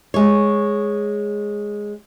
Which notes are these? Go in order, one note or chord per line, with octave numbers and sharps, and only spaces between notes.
G#3 C#5